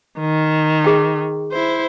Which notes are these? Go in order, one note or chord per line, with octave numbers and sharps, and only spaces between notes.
D#3
G#4 G5
E4 C5